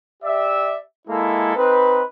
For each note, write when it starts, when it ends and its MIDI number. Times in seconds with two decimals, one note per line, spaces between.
0.22 0.77 67
0.22 0.77 74
0.22 0.77 76
1.07 1.55 56
1.07 1.55 58
1.07 1.55 64
1.07 1.55 69
1.55 2.01 60
1.55 2.01 63
1.55 2.01 71